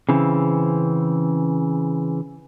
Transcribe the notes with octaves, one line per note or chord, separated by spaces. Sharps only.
C#3 E3 C4